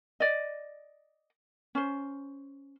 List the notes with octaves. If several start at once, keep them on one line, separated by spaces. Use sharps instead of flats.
D5 D#5
C#4 C5